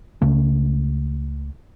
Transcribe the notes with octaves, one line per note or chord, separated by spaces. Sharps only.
C#2 C#3 A3